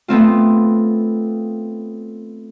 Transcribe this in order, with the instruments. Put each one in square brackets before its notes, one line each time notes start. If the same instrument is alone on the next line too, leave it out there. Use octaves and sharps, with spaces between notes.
[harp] A3 B3 C4 F4